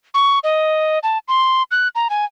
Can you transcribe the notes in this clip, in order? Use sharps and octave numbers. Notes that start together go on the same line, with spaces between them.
C#6
D#5
A5
C6
F#6
A#5
G#5